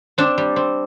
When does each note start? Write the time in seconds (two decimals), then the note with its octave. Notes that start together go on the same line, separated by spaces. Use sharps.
0.18 C4 D4
0.38 G3
0.56 C4